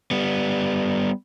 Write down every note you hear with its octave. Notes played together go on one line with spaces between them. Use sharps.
G3 B3